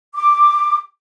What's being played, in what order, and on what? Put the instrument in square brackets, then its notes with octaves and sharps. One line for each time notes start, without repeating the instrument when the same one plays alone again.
[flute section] D6